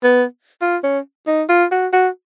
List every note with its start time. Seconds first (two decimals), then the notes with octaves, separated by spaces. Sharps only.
0.03 B3
0.62 F4
0.84 C#4
1.28 D#4
1.49 F4
1.72 F#4
1.93 F#4